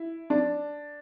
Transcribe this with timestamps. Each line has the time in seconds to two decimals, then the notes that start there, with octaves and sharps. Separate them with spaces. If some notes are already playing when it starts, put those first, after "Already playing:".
Already playing: E4
0.30 D4